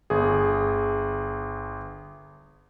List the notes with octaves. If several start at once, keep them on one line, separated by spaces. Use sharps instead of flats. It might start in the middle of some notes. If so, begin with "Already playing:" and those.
G1 G#4